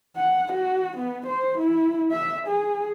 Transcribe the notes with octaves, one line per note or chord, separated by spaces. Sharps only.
F#5
F#4
B3
C5
E4
E5
G#4